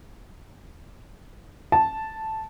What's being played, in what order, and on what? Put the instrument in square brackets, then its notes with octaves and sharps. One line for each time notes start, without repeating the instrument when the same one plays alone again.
[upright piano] A5